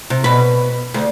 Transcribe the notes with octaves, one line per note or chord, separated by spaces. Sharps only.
C3
B2 B4
D2